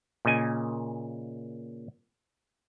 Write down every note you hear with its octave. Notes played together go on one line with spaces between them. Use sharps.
A#2 C#3 D#5 G#5